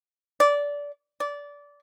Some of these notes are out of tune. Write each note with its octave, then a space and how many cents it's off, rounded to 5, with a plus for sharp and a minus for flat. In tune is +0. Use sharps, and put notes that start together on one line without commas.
D5 -20
D5 -20